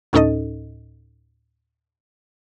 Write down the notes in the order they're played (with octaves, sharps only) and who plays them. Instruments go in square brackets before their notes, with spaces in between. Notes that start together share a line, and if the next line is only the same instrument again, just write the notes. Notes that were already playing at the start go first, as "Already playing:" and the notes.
[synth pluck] D2 A2 C#4 D#4 A4 D#5